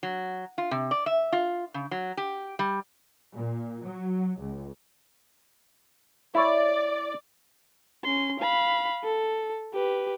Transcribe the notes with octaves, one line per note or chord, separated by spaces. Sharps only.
F#3
F4
C3
D5
E5
F4
C#3
F#3
G4
G3
A#2
F#3
C#2
E4 C#5 D5
C#4 C6
F5 B5
A4
G4 B4